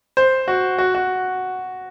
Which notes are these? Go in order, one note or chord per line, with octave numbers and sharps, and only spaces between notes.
C5
F#4
F#4
F#4